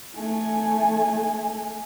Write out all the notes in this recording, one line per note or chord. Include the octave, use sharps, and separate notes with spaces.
A3 G#5